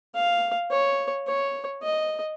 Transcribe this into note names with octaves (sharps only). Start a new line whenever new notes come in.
F5
C#5
C#5
D#5